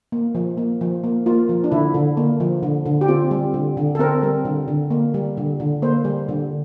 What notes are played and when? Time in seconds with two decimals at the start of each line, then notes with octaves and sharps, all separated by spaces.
0.12 A#3
0.35 F3
0.58 A#3
0.81 F3
1.04 A#3
1.26 A#3 F4
1.49 F3
1.64 D4
1.72 D3 E4
1.94 D3
2.17 A#3
2.40 F3
2.63 D3
2.86 D3
3.01 G4
3.08 C4 F4
3.31 G3
3.54 D3
3.77 D3
3.95 A4
3.99 C4 A#4
4.23 G3
4.45 D3
4.68 D3
4.91 A#3
5.14 G3
5.37 D3
5.60 D3
5.82 A#3 C5
6.05 G3
6.29 D3